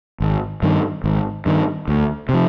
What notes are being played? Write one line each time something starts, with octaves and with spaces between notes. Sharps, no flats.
G#1
G2 D#3
G#1
G2 D#3
D2
C3 F3